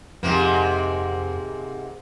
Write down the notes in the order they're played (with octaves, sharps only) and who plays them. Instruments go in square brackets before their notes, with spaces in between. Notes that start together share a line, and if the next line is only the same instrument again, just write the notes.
[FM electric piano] F2 [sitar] G#2 C3 A#3